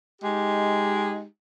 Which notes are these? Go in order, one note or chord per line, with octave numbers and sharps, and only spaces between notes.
G#3 D#4 G4